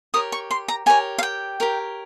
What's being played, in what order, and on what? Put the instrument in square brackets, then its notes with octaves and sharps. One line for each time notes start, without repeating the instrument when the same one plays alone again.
[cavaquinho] G4 A#4 C#5 D#6
C#6
C6
A#5
G4 A#4 C#5 G#5
F5
G5
G4 A#4 C#5